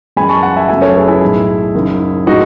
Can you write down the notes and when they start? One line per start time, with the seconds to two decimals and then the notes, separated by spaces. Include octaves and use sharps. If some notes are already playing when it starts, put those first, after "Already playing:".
0.17 F#2 E3 G#3 G#5 B5
0.29 A5 C#6
0.43 F#5 A5
0.56 E5 G#5
0.68 F#2 C#3 F#3 A3 E5 G#5
0.82 A4 C#5
0.96 G#4 B4
1.08 E4 G#4
1.21 B1 A2 G#3
1.75 F#1 F#2 D#3
2.27 A2 G#3 D#4 F#4